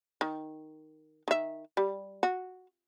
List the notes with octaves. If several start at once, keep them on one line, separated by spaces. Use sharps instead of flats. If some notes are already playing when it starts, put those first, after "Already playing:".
D#3
D#3 E5
G3
F#4